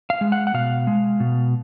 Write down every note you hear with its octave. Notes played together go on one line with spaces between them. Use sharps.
F5
G#3
F#5
F#5
B2 F5
G#3
B2